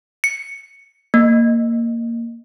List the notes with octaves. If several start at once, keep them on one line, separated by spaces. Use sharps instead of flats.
C#7
A#3